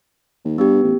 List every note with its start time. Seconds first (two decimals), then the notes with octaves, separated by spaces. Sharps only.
0.45 D#2
0.58 G2 B3 G4
0.83 A1